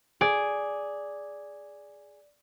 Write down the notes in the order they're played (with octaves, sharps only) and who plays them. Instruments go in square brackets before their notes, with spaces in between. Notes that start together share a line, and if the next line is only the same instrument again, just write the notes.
[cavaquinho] G#4 [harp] D5